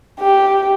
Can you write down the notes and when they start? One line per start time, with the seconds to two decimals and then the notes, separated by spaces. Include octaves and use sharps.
0.20 G4